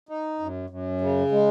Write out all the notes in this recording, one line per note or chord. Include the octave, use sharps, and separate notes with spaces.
D#4
F#2
F#2
C#3
G#3